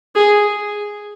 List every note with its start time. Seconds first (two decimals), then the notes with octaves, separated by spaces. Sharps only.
0.15 G#4